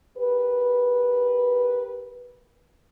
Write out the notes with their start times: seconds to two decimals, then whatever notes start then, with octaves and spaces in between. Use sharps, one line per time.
0.17 G4 A#4 B4